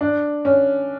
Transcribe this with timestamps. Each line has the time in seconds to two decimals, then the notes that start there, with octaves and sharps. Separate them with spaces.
0.01 D4
0.45 C#4